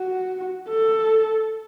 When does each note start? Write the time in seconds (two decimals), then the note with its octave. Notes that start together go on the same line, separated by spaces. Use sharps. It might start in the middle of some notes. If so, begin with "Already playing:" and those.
Already playing: F#4
0.69 A4